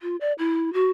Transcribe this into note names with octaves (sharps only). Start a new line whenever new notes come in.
F4
D5
E4
F#4